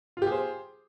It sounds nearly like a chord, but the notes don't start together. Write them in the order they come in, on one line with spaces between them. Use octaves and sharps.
F4 G4 G#4 C5